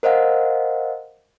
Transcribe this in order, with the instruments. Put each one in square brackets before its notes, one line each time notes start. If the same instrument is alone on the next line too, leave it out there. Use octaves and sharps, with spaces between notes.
[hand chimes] A#4 C5 D#5 F5 F#5